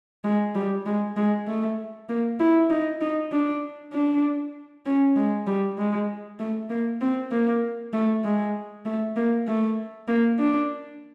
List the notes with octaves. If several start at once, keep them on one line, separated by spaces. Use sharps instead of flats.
G#3
G3
G#3
G#3
A3
A#3
E4
D#4
D#4
D4
D4
C#4
G#3
G3
G#3
A3
A#3
C4
A#3
A3
G#3
A3
A#3
A3
A#3
D4